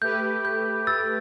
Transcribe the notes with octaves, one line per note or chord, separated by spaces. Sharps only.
A3 G4 B4 G6
G6
E6 A6